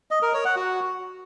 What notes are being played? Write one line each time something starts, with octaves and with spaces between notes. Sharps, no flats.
D#5
A#4
C#5
F#5
F#4